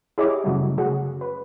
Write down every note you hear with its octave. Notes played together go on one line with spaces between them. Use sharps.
E4 G4 G#4 C#5 D#5 D6
F#2 C#3 F#3 G3 A3
C#3 F#4 G#4
B4